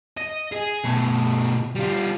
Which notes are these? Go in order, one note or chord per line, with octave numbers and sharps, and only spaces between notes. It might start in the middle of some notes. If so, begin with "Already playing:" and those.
D#5
G#4
B2 A3
G3 F4